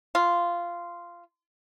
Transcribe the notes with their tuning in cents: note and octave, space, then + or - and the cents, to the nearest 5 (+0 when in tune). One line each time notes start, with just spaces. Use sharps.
F4 -10